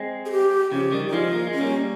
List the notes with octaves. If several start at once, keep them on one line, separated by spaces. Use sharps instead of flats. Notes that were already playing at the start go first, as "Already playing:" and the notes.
Already playing: G#3 C4
G#4
G4
C#3 F3 G4
D#3 G3
D#4
F3 G#3 F4
A#3
G#3
C#4
G3 A#3